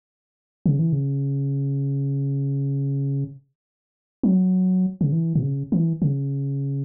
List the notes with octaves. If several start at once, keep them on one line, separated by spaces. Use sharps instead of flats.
C#3
E3
C#3
F#3
C#3
E3
B2
C#3
E3
C#3